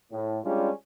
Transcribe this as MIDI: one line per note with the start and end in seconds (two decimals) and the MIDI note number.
0.12 0.39 45
0.45 0.70 55
0.45 0.70 56
0.45 0.70 61
0.45 0.70 62
0.45 0.70 65